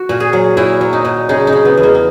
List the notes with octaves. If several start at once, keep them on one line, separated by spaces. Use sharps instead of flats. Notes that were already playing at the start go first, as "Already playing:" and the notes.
Already playing: F#4
A#2
G#4
F#3
A#2 E4
F#3
D#4
A#2
C#3 D#4
D#4
C#3
B3
E2
A#3
A#3